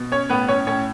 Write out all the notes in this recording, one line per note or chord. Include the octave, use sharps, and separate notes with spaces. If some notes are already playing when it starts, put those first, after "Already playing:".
Already playing: B2
C#4 C#5
A2 B3 B4
C#4 C#5
A2 C#4 C#5